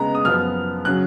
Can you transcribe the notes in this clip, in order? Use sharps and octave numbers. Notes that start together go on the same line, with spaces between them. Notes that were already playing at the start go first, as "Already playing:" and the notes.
Already playing: C#3 G#3 B3 A#5
D#6
F#2 F3 B3 F6
C#3 F#3 F#6